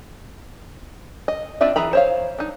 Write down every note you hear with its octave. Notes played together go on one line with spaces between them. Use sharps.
D#5
C4 D4 F4 D5 E5
E3 G#4 A#5 B5
C5 C#5 F5
D4 D#4